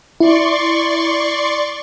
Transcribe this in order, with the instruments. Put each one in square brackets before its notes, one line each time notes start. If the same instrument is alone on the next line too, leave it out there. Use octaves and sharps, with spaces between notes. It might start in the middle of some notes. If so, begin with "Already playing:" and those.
[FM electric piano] E4 [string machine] D5 C6 C#6